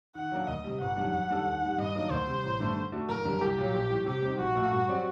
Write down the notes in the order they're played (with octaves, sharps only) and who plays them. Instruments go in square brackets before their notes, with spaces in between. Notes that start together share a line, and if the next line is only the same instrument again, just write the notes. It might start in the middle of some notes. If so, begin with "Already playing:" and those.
[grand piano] D#3 [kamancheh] F#5
[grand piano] F#3 A#3 D4
[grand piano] D2 [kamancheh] D#5
[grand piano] C3 G3
[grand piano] G1 [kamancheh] F#5
[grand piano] F#2 D#3 G3 D4
F#2
D#3 G3 D4 A4
D#2
D#3 G3
[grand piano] G2 [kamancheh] D#5
[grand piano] D#3 F#3 A#3 D4
[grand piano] D2 [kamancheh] C5
[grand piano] C3 G3
A1
G2 D3 A3 D4
D3
A3 D4 F#4
[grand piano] F#1 [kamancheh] A#4
[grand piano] F#2 D3 G3 D4
[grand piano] C2 [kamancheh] G4
[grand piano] A#2 F#3
A#1
A2 G3
[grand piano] C3 [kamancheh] G4
[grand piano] G3 C4 D#4
[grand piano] A#1 [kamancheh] F#4
[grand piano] A#2 A3
G2
F#3 C4 G4 D5